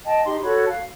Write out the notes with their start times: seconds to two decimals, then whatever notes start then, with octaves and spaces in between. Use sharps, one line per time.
0.05 D#5 G5 A5
0.25 D#4 G4 D#5 C6
0.42 F#4 A4 C#5 B5
0.69 F5